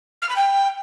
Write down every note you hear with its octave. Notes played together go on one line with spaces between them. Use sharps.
F6
B5
G5